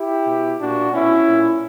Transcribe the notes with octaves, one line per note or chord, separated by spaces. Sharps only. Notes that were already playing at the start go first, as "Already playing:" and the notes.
Already playing: E4 G4
B2
A#2 D4 F#4
B2 C#4 E4
A#2